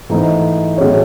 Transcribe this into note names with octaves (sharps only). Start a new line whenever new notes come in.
G#2 E3 A3 D#4
A2 F#3 C#4 G#4 C#5